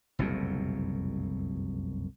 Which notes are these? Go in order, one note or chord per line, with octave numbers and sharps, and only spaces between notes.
F#1 C2 F2 B2